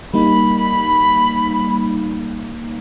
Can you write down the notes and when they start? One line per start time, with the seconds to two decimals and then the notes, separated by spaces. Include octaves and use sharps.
0.14 G3 A#3 D#4 B5